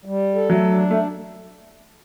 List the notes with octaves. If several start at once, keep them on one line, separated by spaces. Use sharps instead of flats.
G3
A4
F#3 A3
D4
A3